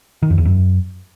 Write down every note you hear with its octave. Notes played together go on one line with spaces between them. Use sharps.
D#3
F2
E2
F#2